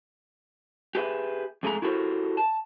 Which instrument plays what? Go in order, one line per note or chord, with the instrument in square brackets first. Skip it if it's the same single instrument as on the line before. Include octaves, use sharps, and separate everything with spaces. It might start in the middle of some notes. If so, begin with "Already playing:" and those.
[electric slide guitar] G4 G#4 B4 D#5 E5
F2 G#2 G#3 A3 G#4 A#5
E4 F#4 G4 A4 A#4 C5
A5